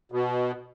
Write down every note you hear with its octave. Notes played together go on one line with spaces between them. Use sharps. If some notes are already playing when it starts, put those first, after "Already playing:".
B2